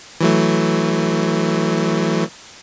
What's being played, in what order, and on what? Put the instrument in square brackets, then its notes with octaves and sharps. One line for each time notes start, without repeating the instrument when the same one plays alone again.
[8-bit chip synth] E3 F#3 A3